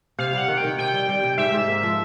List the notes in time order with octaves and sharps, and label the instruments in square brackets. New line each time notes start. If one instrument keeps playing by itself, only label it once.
[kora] C3 [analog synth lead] F5
[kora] G3 [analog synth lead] F#5
[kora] D#3
[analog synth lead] G5
[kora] D#3
[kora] C3 [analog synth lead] G5
[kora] G3
G3
C3
[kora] G#2 [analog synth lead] E5
[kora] G#2
A#3
F3